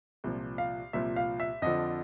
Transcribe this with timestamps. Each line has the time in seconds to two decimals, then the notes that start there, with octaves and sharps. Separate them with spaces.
0.24 C2 A#2 F3
0.58 F5
0.93 C2 A#2 F3 E5
1.16 F5
1.40 E5
1.62 F2 D3 F3 D#5